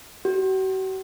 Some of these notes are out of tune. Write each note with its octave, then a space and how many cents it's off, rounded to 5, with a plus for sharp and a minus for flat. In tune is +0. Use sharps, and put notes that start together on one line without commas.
F#4 +40